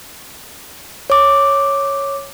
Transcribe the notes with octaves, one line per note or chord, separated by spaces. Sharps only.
C#5 D6